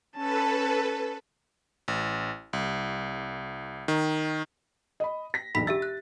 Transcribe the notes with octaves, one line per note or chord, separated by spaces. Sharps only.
C#4 A4 B4 A5
A1
C2
D#3
D#5 B5
A#6 B6
E1 B1 B5 B6
G4 E5 E6 A6
F#6